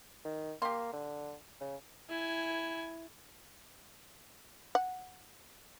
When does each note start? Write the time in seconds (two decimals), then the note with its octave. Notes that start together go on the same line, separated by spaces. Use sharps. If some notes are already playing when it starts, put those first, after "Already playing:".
0.25 D#3
0.62 A#3 G4 C6
0.93 D3
1.61 C#3
2.09 E4 G#5
4.75 F#5